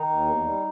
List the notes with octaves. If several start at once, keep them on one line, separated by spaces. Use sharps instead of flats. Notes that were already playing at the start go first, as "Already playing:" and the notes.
Already playing: D#3 D#4
D#2
E2
G3